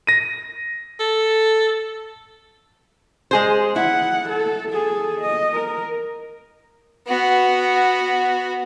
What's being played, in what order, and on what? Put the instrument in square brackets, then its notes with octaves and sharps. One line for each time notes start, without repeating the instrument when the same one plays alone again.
[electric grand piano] A#6 D#7
[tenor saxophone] A4
[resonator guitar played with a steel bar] G#3 G#4 C5
[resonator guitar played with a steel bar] E4 [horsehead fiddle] F#5
[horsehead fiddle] A4
G#4 A4
D#5
A#4
[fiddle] B3 F#4